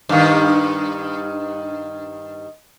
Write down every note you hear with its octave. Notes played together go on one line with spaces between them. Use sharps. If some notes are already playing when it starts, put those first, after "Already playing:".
G2 D#3